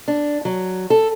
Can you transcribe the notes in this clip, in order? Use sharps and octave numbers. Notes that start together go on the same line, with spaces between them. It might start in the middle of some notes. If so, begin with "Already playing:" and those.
D4
F#3
A4